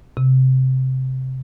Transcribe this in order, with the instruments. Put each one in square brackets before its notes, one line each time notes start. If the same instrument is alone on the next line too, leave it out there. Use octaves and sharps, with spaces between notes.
[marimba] C3